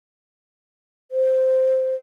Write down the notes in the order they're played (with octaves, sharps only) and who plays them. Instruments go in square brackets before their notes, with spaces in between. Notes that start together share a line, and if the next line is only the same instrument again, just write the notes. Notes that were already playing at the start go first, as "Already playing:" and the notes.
[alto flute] C5